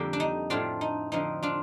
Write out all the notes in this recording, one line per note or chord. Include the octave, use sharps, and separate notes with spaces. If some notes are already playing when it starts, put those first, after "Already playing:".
Already playing: F2 D3 G3 A#3 G4
D4
D#4
A2 A3 C4 D4 F4
D#4
D3 F3 C4 D#4
D4 F4